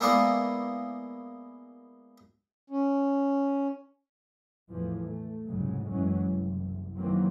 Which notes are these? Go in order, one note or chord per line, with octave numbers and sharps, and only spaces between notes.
G#3 A#3 B3 E4 D5 F5
C#4
E2 A2 E3 F3
A3
F1 C2 G#2 C#3 F#3 G#3
F#1 F#2 E3 F#3 G#3 C#4
F#1 C2
D#3 E3 F#3 A#3 C4